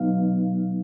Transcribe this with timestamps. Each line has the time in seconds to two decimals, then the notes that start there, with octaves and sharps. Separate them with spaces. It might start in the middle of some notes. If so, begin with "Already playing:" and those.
Already playing: B2 F#3 B3 D#4 F5